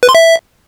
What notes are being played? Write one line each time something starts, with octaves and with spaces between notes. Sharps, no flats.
B4
C6
E5